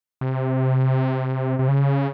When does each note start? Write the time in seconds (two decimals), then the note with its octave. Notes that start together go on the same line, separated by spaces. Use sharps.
0.21 C3
1.59 C3
1.68 C#3